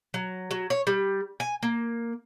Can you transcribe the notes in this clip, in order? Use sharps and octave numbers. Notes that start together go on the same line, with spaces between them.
F#3
F#3
C#5
G3
G#5
A#3